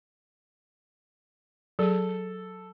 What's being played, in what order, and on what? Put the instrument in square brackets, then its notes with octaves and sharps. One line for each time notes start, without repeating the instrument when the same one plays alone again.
[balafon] F#3 G#4 [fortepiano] A4